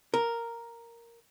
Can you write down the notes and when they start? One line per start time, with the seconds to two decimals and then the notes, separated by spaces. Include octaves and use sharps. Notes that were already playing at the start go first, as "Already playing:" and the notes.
0.14 A#4